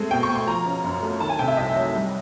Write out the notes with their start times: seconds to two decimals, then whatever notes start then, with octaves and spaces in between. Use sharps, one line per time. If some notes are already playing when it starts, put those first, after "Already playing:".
Already playing: G#3 A3 C4
0.11 B2 G5
0.23 C#6
0.30 B2
0.35 C6
0.47 F3 A#5
0.66 C#3
0.84 F#2
1.03 A3
1.20 D#3 A5
1.29 G#5
1.39 C3 G5
1.48 E5
1.57 C2 D#5
1.75 F#3
1.94 G3